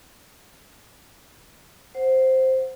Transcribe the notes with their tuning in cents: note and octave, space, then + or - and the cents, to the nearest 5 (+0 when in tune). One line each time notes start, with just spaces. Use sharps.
C5 +0 F#5 +0